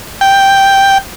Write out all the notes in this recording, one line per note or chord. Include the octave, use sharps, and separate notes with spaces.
G5